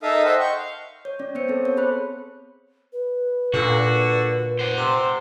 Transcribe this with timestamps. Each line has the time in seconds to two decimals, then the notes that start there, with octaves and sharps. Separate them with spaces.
0.02 D#4 A4 A#4 E5 F5 D#6
0.25 C5 D#5 E5 F#5 G5
0.40 C#6 G6
0.58 F5
1.05 C#5
1.19 C#4 D5
1.35 B3 C5 C#5 C#7
1.48 B3 C4 A4
1.65 C#5
1.77 G#4 C5 B5 F#6
2.93 B4
3.54 A#2 D3 F#4
4.59 C5 F#5
4.77 C3